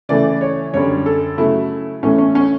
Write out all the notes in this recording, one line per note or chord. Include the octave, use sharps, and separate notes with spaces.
C#3 E3 A3 D5
C#5
F#2 D3 G3 C#5
A4
C#3 F#3 A3 E4
A2 E3 A3 C#4
C#4
C#4